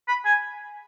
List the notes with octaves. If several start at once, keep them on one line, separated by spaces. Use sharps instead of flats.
B5
G#5